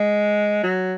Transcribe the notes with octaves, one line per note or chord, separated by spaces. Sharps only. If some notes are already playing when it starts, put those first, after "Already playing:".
Already playing: G#3
F#3